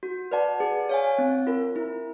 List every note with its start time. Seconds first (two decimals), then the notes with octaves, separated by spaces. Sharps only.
0.03 F#4
0.31 B4 D5 F#5 A5
0.60 G#4
0.89 C#5 F5 G#5
1.18 C4
1.47 F4 A#4
1.76 E4